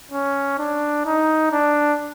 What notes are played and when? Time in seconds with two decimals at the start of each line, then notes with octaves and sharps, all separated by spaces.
0.11 C#4
0.58 D4
1.06 D#4
1.52 D4